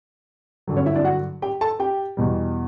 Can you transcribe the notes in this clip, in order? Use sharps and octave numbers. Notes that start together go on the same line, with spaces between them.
G2 D3 F#3
C#4 C#5
E4 E5
D4 D5
F#4 F#5
G4 G5
A4 A5
G4 G5
E2 B2 G3